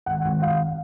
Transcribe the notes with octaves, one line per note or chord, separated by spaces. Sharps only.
G#1 F#5
G#1
G#1 F5